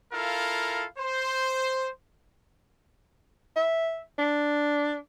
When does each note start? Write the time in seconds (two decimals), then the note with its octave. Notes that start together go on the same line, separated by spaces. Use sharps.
0.12 E4 F4 A4 A#4 F5
0.98 C5
3.57 E5
4.18 D4